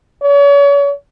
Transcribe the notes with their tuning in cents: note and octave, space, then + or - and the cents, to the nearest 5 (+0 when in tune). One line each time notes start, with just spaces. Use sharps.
C#5 +40